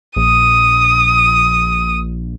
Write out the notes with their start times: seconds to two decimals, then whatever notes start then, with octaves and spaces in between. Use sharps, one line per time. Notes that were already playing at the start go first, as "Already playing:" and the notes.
0.16 A#1 D#6